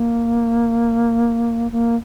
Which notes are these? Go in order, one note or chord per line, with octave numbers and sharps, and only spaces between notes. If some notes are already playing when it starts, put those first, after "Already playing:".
Already playing: A#3
A#3